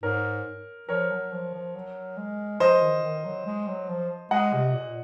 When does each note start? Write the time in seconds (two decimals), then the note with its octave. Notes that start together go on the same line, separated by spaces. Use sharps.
0.03 G#2 A#4 C#5
0.89 F3 A#4 C#5
1.11 F#3
1.33 F3
1.54 F3
1.75 F#3
2.17 G#3
2.60 F3 C5 D#5
2.82 D#3
3.04 D#3
3.25 F#3
3.46 G#3
3.68 F#3
3.89 F3
4.31 G#3 D#5 F#5
4.54 C3
4.74 A#2